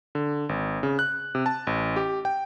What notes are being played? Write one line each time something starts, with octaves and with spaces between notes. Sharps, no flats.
D3
G#1
C#3
F#6
C3
A5
A1
G4
G5